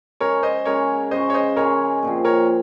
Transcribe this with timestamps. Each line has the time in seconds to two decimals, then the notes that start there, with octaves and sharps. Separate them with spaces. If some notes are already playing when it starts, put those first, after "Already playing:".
0.20 C#3 G#3 C#4 G#4 A#4 C#5
0.43 C5 D#5
0.65 C#3 G#3 C#4 G#4 A#4 C#5
1.11 C#3 G#3 C#4 G#4 C5 D#5
1.30 C#5
1.34 C5 D#5
1.56 C#3 G#3 C#4 G#4 A#4 C#5
2.03 A#2 F3 C4
2.25 A#4 C#5